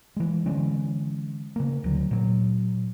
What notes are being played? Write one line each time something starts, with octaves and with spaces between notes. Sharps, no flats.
E3 G#3
D3 E3 G#3 C#4
C#3 A#3
D2 F#3
A#2 F#3